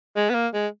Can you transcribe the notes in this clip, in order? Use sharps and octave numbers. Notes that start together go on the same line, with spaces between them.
G#3
B3
A#3
G#3